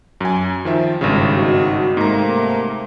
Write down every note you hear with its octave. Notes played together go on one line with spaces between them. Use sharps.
F#2 G#5
D#3 F3 E5
G#1 G2 C#3
D#4 F#4
G#2 C3 A3 A#3 A#5